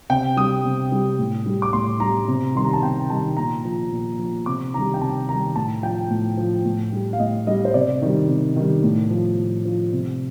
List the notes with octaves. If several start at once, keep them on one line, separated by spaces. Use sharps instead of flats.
C3 G5
G3 D#6
C3
G3
A2
G3
D6
A2 C6
G3 A#5
C3
D#3 G3 C6
A#5
A5
C3 G5
D#3 G3 A5
A#2 A#5
F3
A#2
F3
C3 D6
D#3 G3 A#5
G5
C3 A5
D#3 G3 A#5
A2 A5
F3 G5
A2
F3
A2
G3
F5
A2 D#5
G3 D#5
C5
C3 D5
D#3 G3
C3
D#3 G3
A2
F3
A2
F3
C3